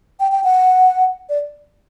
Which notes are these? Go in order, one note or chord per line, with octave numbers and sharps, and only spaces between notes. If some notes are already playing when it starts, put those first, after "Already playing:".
G5
G5
F#5
D5